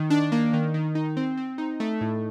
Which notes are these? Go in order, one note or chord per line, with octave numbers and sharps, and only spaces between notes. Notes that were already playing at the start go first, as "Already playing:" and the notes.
Already playing: D#3
D4
A#3
D#3
D#3
D#4
C4
C4
D#4
A3
A2